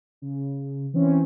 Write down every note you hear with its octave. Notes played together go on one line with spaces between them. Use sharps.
C#3
E3 C4 C#4